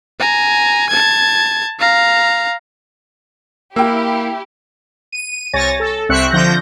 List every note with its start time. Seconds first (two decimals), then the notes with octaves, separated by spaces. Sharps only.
0.19 G#5 A#5
0.89 A5 G#6
1.79 F5 A#5
3.76 A#3 E4 G4 G5 E6
5.12 D#7
5.53 C2 C#5 G#5 A6 A#6
5.80 A4
6.09 C2 C4 E5 C#6 F#6 C#7
6.31 D3 F3 G6 A#6